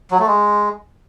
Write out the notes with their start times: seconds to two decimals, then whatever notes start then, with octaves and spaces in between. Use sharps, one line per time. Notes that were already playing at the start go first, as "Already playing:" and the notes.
0.11 F#3
0.19 A3
0.27 G#3